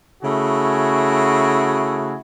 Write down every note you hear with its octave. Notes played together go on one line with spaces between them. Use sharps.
C#3 A3 E4 F#4 G#4